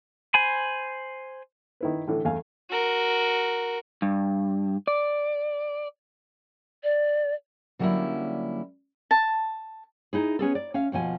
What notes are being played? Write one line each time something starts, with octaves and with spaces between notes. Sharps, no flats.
C5 G#5 B5
D#3 E4 B4
A2 D3 E3
E2 A3 F5 G#5
F#4 A#4
G2
D5
D5
D3 F#3 G3 A#3 C#4 E4
A5
D#4 E4 G#4
B3 C#4 G#4 A4
D5
C#4 E5 F5
D#2 B2 F3 G#5